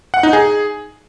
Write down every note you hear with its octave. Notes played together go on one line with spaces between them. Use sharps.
F#5
D#4
G#4